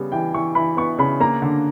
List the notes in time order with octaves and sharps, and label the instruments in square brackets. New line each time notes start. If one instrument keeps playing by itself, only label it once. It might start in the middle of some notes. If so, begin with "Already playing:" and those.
Already playing: [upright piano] C#3 G3 B3
E3 G5
E3 C#6
E3 B5
B3 C#6
C#3 B5
A#3 A#5
D3